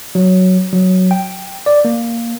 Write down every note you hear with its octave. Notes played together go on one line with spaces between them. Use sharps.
F#3
F#3
G5
D5
A#3